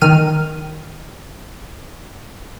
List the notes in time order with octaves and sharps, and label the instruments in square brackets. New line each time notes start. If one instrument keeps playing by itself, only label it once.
[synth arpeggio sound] D#3 F6 D#7